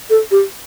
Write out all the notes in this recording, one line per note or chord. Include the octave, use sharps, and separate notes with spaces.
A4
G4